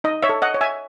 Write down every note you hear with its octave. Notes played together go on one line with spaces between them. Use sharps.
D#4 D#5
C#5 E5
A4
D#5 F#5
C#5
E5 G#5